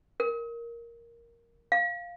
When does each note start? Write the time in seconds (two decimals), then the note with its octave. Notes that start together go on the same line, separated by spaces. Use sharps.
0.20 A#4
1.72 F5